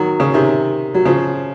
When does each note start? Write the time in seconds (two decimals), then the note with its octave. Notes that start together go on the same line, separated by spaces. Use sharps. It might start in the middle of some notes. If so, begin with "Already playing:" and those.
Already playing: D#3 F#3
0.20 C#3
0.34 C3 D#3
0.94 F#3
1.05 C#3 F3